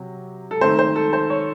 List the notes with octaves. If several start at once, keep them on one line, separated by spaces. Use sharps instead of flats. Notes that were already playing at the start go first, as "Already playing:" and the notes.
Already playing: C3 F#3
A4
D#3 A3 C4 C5
C5
A4
C5
C#5